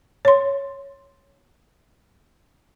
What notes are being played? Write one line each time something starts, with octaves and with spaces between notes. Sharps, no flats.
C#5 C6